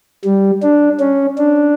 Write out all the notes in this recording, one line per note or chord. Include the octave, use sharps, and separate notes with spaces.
G3
D4
C#4
D4